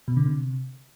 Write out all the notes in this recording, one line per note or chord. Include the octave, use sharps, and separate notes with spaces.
B2
D3
C3